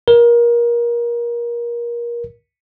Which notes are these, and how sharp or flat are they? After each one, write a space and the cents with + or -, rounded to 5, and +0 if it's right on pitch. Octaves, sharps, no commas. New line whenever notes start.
A#4 +25